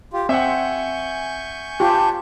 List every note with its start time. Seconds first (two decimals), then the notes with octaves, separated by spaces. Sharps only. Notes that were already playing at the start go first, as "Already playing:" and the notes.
0.13 F4 G4
0.29 C4 E5 F#5 G#5 C#6 G6
1.80 F4 G4 A5